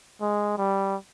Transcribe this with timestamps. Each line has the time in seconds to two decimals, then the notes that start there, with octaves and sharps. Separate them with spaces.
0.21 G#3
0.57 G3